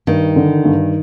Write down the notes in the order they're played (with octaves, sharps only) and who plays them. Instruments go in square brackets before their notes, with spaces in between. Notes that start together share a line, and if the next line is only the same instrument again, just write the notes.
[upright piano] G2 [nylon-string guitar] D#3
[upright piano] D3
G2